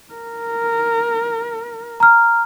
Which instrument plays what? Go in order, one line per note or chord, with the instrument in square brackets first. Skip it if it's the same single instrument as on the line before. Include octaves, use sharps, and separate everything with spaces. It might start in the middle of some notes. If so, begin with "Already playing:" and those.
[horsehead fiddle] A#4
[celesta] A#5 F6